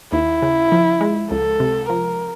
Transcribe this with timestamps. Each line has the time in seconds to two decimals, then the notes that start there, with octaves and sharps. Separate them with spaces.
0.12 D#2 E4
0.42 C#3
0.72 F3
1.01 G#3
1.30 C#2 A4
1.60 C3
1.89 F3 A#4